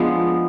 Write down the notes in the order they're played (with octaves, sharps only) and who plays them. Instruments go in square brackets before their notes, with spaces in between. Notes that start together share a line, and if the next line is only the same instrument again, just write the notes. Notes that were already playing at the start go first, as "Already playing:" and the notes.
Already playing: [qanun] F3 G#3 B3 D4